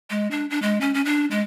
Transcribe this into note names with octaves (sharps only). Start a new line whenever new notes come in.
G#3
D4
D4
G#3
C#4
C#4
D4
G#3